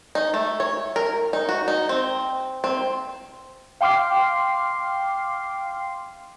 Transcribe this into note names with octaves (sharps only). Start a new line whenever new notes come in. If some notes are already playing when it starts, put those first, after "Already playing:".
D#4
A3
C#5
A#4
D#4
F#4
D#4
C4
C4
F5 G5 C6 D6 F6 C7